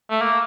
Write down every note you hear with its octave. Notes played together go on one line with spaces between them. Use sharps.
A3
A#3